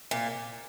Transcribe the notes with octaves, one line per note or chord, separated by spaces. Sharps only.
A#2